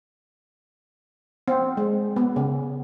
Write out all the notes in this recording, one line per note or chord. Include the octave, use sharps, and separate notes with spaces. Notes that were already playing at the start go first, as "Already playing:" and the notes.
C4
G#3
B3
C#3